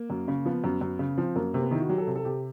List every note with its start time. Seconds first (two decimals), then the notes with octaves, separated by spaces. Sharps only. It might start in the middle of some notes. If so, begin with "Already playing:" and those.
Already playing: A#3
0.10 F#2
0.28 C#3
0.45 F3 B3
0.64 F#2
0.81 F#2
0.99 C#3
1.17 F3 C4
1.36 F#2 A#3
1.54 C3 A#3
1.62 B3
1.71 D#3 E4
1.80 F#4
1.89 F#3 G4
1.98 A4
2.07 C3
2.16 A4
2.25 C3 G4